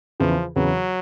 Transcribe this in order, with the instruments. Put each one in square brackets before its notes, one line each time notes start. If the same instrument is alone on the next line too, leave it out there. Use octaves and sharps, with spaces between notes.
[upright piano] E2 C#3 E3 [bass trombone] F3
[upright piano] E2 C#3 E3 [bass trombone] F#3